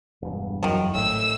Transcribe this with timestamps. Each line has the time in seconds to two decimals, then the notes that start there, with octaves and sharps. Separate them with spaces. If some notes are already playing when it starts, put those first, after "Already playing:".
0.22 E1 G2
0.63 F#1 E2 D#3 F3 F#3
0.95 G#1 A2 E6